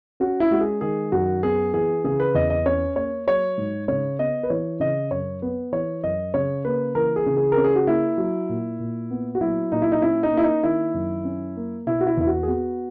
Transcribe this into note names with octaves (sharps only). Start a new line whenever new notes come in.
C#4 F#4
E4
G#3 F#4
G#4
D#3 G#4
F#2 F#4
B3 G#4
E3 G#4
C#3 G#4
B4
E2 D#5
D#5
C#4 C#5
A#3 C#5
F#3 C#5
G#2
C#3 C#5
B3 D#5
B4
E3 C#5
C#3 D#5
F#2 C#5
B3 B4
E3 C#5
F#2 D#5
C#3 C#5
A#3 B4
E3 A#4
G#4
C#3
G#4
A#4
C#4
G#4
F#4
A#3 E4
F#3
A#2
A#2
B3
F#4
F#3 E4
A#2 D#4
E4
D#4
C#4 E4
D#4
A#3 E4
D#4
D#3 E4
F#2
C#4
A#3
B2 E4
F#4
E4
E2 E4
F#4
G#4
B3 F#4